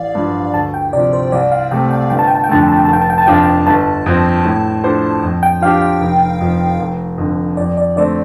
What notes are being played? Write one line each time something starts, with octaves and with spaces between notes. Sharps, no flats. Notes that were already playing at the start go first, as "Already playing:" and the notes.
Already playing: A1 D5 F5
G2 F3
D2 A5
G5
C3 F3 D5
C5
C2 D5
F5
C3 A3 G5
G5
G1 G5
A5
G5
A5
G5
F2 D3 A3 A5
G5
A5
G5
F1 A5
G5
A5
G5
A5
F2 F3 D4 F4 G5
A5
G5
G1 A5
F2 F3 C4
A2
F3 D4 A4 C5
F2
G5
F3 D4 G4 F5
F5
F1
F2 F3
F1
F2 D3
F2 D5
D5
D3 A3 C4 D5